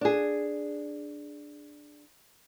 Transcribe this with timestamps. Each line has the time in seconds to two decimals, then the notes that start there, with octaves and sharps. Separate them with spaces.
0.01 D4 G#4